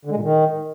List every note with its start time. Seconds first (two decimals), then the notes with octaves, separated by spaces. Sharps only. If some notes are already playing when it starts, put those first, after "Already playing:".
0.05 D3
0.11 G#3
0.17 A#2
0.22 D#3